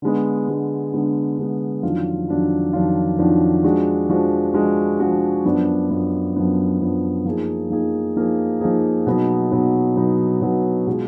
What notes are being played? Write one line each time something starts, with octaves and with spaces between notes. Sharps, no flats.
D3 G#3 B3
D3 G#3 B3
D3 G#3 B3
D3 G#3 B3
F2 D#3 F#3 D4 F4
F2 D#3 F#3 D4 F4
F2 D#3 F#3 D4 F4
F2 D#3 F#3 D4 F4
F3 G#3 D4 F#4
F3 G#3 D4 F#4
F3 G#3 D4 F#4
F3 G#3 D4 F#4
F#2 F3 B3 D4
F#2 F3 B3 D4
F#2 F3 B3 D4
F#2 F3 B3 D4
F3 A#3 D#4 G#4
F3 A#3 D#4 G#4
F3 A#3 D#4 G#4
F3 A#3 D#4 G#4
B2 F#3 B3 D#4
B2 F#3 B3 D#4
B2 F#3 B3 D#4
B2 F#3 B3 D#4
B2 G#3 B3 F4 G#4